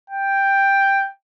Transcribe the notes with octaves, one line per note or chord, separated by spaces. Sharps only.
G5